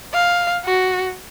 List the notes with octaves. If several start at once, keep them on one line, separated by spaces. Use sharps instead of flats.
F5
F#4